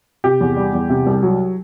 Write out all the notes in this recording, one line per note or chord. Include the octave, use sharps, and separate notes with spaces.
C3 G4
E2
G3
E2
C3
C2
F#3